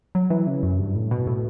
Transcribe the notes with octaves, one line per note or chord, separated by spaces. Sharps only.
F#3
E3
C#3
F#2
G2
A2
B2
A2